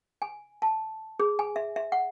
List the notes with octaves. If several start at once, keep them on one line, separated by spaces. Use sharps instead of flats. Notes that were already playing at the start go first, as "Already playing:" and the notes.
G#5
A5
G#4
G#5
E5
E5
F#5